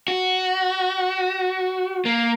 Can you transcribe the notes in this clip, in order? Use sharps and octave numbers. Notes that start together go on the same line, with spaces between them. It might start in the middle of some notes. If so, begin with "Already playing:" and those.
F#4
A#3